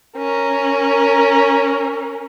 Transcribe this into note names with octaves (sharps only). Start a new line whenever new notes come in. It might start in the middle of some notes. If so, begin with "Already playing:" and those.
C#4 A#4